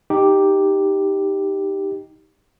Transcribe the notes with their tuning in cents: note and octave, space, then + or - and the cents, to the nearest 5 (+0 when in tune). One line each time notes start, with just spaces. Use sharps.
D#4 +0 G4 +0